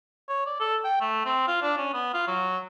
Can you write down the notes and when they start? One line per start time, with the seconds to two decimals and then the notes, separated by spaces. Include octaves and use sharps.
0.29 C#5
0.46 D5
0.60 A4
0.84 G5
1.01 A3
1.25 C4
1.48 F4
1.62 D4
1.77 C#4
1.94 B3
2.14 F4
2.27 F#3